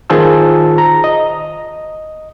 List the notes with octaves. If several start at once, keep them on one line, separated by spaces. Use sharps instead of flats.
D#3 F4 G#4 C5 A5 E6
A#5
D#5